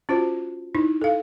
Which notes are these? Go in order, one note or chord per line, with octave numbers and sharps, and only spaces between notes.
C#4 F4 F#4 C5
D#4 E4
A4 F5